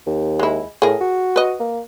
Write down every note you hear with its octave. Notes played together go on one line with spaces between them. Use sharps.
D#2
G#3 E4
A2 G#4 A#4
F#4
B4 D#5
A#3